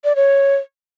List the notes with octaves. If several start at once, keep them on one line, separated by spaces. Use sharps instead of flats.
D5
C#5